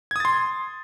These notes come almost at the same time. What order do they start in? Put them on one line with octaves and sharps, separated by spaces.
G#6 D#6 A6 C6